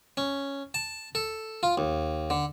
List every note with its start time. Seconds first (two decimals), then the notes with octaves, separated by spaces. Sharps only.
0.17 C#4
0.74 A5
1.15 A4
1.63 F4
1.78 D#2
2.30 D3